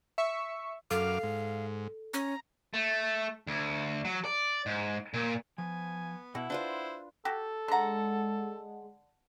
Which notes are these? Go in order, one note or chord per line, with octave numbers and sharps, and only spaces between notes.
E5 C#6
F#2 A4 F5 D6 F6
G#2
C#4 A#5
A3
D2
F#3
D5
G#2
A#2
F3 B3 G#5
B2 E4 F#5
D4 F4 B4 C5
F#4 G4 A4
D3 G#3 F#5 A5 A#5